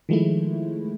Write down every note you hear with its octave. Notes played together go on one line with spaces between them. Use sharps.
D#3 F3 G#3 A3 E4